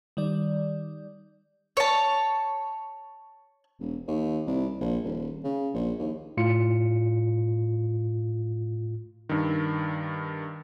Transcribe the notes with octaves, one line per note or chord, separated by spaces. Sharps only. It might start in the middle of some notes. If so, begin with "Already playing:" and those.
D#3 G3 D5
C#5 A5
E1
D#2
C2
A#1
D#1
C#3
A#1
D#2
A2 F4 C#7
G2 D#3